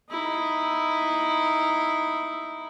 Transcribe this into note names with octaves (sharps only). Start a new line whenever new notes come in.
D#4 E4